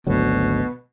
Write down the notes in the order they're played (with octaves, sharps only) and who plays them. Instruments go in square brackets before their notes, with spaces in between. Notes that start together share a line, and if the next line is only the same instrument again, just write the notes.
[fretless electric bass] G#1 D2 F#3 [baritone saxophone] B2